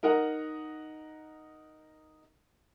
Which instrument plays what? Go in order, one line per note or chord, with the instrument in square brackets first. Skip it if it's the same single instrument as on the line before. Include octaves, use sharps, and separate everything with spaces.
[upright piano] D#4 A#4 D#5 F#5 A#5